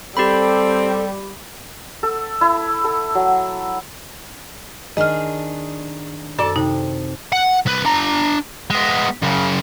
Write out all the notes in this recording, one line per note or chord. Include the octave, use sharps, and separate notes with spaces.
G3 C4 G4 A4 B5
A4
E4
A4
F#3
D#3 D4 G#4 D#5 F6
F#2 A4 D5
C3 D#4
F#5
C2 B4
D4 A#5
G#3 B3
F#2 C#3